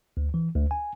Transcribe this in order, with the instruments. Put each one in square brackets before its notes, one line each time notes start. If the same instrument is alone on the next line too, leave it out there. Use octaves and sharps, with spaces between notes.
[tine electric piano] D2
E3
D2
G#5